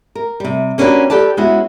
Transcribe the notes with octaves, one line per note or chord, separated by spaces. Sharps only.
A#4
C3 G3
A#3 C#4 D4 F#4 G4 B4
G4 A4 B4 D5 A5
G#3 B3 C#4 E4 F#4